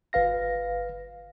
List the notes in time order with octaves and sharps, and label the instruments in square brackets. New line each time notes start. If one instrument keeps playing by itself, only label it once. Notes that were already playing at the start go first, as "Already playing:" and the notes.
[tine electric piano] G1 B4 F5 A#6